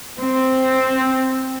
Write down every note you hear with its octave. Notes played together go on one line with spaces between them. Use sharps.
C4